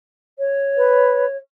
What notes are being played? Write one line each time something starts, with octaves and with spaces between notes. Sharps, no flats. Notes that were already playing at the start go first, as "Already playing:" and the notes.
C#5
B4